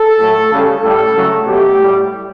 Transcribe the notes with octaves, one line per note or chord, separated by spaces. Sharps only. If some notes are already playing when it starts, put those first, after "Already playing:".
Already playing: A4
A2 F#3 A3
C#3 G3
A2 G3 A4
C#3 F#3 A3
B2 F#3 A3 G4
A2 G3